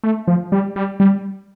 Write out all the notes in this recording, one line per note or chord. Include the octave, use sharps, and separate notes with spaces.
A3
F3
G3
G3
G3